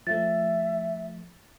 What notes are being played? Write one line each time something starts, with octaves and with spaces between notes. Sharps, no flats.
F3 A3 E5 A6